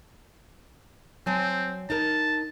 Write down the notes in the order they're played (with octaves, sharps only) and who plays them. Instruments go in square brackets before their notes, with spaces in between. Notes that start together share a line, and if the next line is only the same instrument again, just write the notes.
[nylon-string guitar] F#3 G#5 A5 [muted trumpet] C4
[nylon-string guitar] D#4 A#4 [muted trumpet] A5